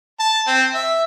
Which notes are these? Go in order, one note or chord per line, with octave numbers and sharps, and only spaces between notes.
A5
C4
E5